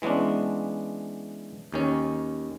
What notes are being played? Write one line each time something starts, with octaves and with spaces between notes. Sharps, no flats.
E3 G#3 B3 C#4 D4
D#2 D#3 C#4